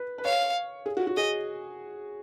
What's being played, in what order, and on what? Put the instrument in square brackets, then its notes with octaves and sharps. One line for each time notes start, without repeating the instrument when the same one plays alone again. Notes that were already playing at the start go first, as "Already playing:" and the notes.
Already playing: [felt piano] B4
B4
[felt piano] C#5 [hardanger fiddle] F5
[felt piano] G#4
F#4
F#4
[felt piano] G#4 [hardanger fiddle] D#5